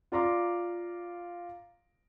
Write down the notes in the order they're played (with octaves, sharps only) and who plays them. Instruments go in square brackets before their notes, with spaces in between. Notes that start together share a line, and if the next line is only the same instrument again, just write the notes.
[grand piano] F4 D5 A#5 C6 D6